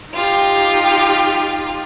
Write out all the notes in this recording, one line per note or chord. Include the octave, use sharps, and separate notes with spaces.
D#4 F4 G4